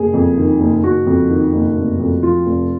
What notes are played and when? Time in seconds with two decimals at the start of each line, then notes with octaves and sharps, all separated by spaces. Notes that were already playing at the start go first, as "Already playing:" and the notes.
Already playing: F#1 G#4
0.13 F2
0.38 D#3
0.60 F#1
0.83 F#1 F#4
1.06 F2
1.30 D#3
1.53 F#1
1.76 F1
1.99 F2
2.23 F3 F4
2.46 F1